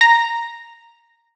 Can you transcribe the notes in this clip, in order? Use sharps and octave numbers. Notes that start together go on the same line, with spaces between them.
A#5